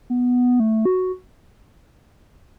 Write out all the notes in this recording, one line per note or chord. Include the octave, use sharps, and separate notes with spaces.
B3
A3
F#4